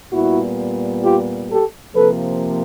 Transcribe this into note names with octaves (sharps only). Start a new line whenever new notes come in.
A#2 G3 B3 E4 F#4
F4 G4
G4 A4
C3 F3 A#3 A4 B4